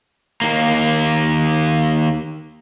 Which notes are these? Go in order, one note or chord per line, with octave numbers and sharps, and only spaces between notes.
D#2 A#3